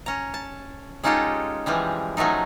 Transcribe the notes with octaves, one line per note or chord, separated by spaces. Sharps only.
C#4 A#5
A5
G#3 C#4 D#4 F4 G4 A4
E3 F3 G3 G#3
F3 F#3 G#3 A3 D#4